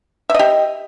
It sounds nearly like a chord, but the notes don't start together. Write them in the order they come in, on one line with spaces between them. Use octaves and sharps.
E5 D#5 G4